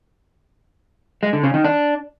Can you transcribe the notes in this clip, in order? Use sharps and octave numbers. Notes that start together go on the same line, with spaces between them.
G#3
D3
C#3
D#3
D4